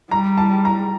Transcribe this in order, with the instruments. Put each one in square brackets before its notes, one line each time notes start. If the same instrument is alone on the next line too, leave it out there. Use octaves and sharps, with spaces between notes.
[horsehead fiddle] G3 [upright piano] A#5
[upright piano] A5
A#5